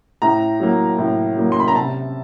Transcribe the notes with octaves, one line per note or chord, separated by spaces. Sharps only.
A2 A#5
F#3 A#3
A2
F#3 A#3
C6
B5
A#5
C3 A5